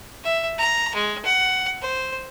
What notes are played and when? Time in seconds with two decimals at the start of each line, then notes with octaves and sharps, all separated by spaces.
0.24 E5
0.58 A#5
0.95 G#3
1.25 F#5
1.81 C5